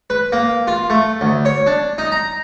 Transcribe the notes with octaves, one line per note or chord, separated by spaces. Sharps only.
B4
A#3
F4
A3
D2
C#5
D4
D#4
A#5